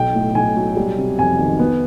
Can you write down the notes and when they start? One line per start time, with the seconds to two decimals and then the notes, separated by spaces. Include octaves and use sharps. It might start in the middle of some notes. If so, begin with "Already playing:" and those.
Already playing: B1 G5
0.14 A2
0.35 B1 G#5
0.56 F#3
0.76 G3
0.98 C3
1.19 F2 G#5
1.39 D#3
1.59 B3